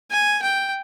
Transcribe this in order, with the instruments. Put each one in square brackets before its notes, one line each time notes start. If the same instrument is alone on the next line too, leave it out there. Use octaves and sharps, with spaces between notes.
[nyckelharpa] G#5
G5